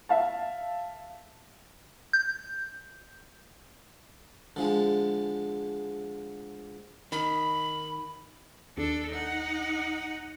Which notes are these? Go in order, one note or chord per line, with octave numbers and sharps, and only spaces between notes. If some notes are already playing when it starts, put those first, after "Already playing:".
E5 F5 A5
G6
D3 F3 G#3
D#3 B5
D#2 D4 A4
D#4 F#5